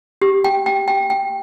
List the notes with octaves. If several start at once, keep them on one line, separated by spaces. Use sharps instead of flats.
G4
G5
G5
G5
G5